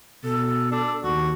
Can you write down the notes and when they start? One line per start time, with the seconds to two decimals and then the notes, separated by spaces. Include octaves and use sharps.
0.24 B2 A4
0.71 D4
1.04 D#2 F#4